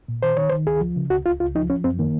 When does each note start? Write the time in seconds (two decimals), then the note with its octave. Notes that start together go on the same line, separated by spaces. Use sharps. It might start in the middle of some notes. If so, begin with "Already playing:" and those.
0.08 A#2
0.23 D#3 C5
0.37 D#3 C#5
0.49 D#3 C5
0.67 C#2 G#4
0.81 F3
0.96 C#3
1.10 C#2 F#4
1.25 C#2 F4
1.40 C#2 F4
1.55 F3 D#4
1.70 F3 C#4
1.84 F#2 C4
1.99 D#3 A#3